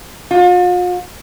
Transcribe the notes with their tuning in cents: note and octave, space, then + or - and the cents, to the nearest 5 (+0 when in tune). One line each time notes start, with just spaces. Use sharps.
F4 +45